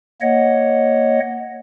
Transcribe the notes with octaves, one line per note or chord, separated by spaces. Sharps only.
A#3 C#5 D#5 F#5